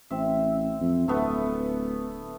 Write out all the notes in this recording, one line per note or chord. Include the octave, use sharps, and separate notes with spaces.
A1 C4 E5
F2
D1 A3 B3